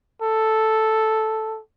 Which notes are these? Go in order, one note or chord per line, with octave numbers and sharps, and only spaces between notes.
A4